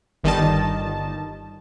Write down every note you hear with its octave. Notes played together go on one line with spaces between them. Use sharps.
G1 D#3 G3 D#5 A5